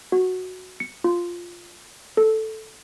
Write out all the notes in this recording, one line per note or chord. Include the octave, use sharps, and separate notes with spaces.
F#4
C#7
F4
A4